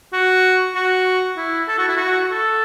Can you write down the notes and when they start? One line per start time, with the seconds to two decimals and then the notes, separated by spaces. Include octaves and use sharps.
0.13 F#4
0.75 F#4
1.37 E4
1.68 A4
1.78 F#4
1.88 E4
1.97 F#4
2.31 A4